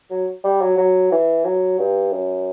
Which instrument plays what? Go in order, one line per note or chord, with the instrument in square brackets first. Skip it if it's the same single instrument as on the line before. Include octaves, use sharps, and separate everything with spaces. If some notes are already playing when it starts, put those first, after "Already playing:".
[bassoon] F#3
G3
F#3
F#3
E3
F#3
G2
F#2